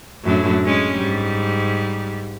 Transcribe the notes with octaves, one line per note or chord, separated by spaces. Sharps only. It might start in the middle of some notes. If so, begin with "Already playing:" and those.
F#2 A2 D4
G#3 C#4
G#2 G3